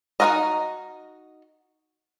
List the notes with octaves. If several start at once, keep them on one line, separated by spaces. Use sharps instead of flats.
D#4 E4 F#4 A#4 D#5